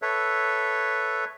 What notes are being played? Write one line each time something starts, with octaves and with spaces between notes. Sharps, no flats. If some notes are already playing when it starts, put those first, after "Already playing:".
A4 B4 C#5 E5